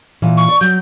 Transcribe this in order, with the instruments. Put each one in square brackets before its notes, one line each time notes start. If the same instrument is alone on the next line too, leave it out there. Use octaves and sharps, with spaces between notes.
[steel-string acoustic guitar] A#2 E3
[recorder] C#6
[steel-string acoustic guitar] D5
[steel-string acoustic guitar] F#3 [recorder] G6